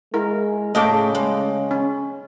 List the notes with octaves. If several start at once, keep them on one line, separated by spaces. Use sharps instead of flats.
G#3 E4 A#4
A2 C#3 A3 D#5 F5 G5 D6
G#3
C#4